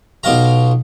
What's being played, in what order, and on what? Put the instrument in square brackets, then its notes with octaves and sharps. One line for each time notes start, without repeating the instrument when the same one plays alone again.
[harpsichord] B1 B2 F4 F5 A#5